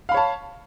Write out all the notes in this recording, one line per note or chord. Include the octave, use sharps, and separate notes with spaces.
C#5 F5 A5 B5